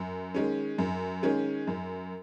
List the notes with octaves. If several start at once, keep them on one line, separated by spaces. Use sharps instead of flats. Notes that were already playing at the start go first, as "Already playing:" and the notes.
Already playing: F#2
D#3 G#3 C#4
F#2
D#3 G#3 C#4
F#2